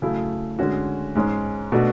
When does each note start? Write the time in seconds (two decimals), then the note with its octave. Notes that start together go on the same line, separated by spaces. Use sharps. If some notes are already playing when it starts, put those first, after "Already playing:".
0.02 C#3 F#3 A3 E4
0.59 D3 G#3 C#4 F#4
1.15 G#2 G#3 C#4
1.72 B2 A3 D4 F#4